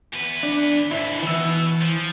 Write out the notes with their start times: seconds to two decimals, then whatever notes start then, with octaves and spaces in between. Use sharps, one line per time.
0.14 E2 B4
0.43 D4
0.91 D#2 G#2 E4
1.23 B2 E3 E6
1.81 F3